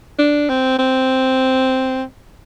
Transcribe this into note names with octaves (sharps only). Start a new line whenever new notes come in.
D4
C4
C4